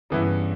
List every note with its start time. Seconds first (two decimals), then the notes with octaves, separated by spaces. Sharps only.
0.10 G2 C#3 E3 B3 E4